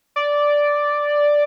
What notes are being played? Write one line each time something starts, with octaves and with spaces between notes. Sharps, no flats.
D5